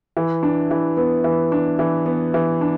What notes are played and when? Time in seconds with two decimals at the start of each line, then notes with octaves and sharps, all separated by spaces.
0.17 E3
0.43 D4
0.71 E3
0.97 B3
1.24 E3
1.52 D4
1.79 E3
2.06 B3
2.34 E3
2.61 D4